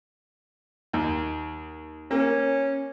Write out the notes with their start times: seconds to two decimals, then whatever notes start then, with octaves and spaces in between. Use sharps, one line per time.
0.93 D#2
2.11 A#3 C#4